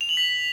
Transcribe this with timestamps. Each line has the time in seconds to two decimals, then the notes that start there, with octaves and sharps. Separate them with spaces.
0.01 F7
0.09 F#7
0.17 B6